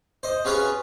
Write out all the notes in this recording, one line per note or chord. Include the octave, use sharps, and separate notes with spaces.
C5 D#5
C#4 F4 F#4 G#4 B4 C#5